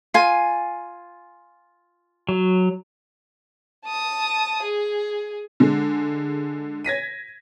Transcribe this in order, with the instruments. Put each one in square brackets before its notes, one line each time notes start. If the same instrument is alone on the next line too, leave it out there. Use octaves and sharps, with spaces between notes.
[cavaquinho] F4 G#5
[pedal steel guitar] F#3
[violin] A5 D#6
G#4
[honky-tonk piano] D3 G#3
G#6 A#6 B6 D#7